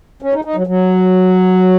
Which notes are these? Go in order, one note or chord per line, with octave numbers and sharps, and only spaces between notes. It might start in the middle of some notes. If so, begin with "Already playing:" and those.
C#4
D#4
D#4
F#3
F#3